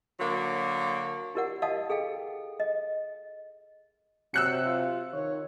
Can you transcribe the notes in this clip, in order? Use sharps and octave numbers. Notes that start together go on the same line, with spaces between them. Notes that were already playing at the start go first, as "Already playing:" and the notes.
D3 F#3 A#3
E4 G4 A#4 D5 F#5
D5 D#5 F5 F#5 A5 D#6
G#4 A4 F5 G5
D#5
C3 F#3 E6 F#6 C#7
F4
D#3 C#5